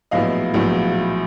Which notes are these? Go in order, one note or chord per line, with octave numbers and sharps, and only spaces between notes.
A#1 A2 F#3 B3 E4 D#5 F5
A#1 A2 F#3 B3 E4